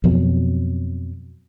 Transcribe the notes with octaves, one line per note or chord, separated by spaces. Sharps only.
F2 B2 F#3